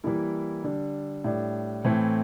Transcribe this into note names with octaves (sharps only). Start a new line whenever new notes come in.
E3 G3 A#3 E4
D3 G3 D4
A2 G3 D4
A2 E3 A3 C4